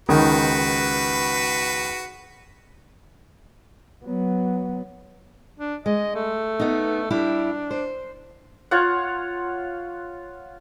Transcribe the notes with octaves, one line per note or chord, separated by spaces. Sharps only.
C#2 D#3 F#4 B4
F#3 B3
D4
G#3 D#5
A3
B3 D#4
G3 D4 E4 G4
C5
F4 C#5 F5 F#5